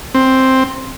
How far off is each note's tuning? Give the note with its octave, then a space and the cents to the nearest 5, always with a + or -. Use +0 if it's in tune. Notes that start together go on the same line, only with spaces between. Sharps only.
C4 +5